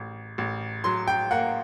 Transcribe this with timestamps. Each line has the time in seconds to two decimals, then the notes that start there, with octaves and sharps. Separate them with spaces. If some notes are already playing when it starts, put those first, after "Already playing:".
Already playing: A1
0.38 A1
0.84 F#3 C6
1.08 G5
1.31 A#3 F#5